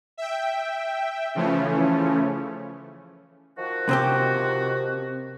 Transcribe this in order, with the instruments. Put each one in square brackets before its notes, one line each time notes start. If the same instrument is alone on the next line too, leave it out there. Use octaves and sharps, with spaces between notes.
[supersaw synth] E5 G5
C#3 E3 F3 A3 C#4
[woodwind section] D#3 F3 F#4
[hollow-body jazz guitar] C3 C4 G4